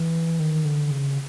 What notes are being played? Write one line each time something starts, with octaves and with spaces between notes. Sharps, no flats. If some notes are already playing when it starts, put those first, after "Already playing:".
Already playing: E3
D#3
D3
C#3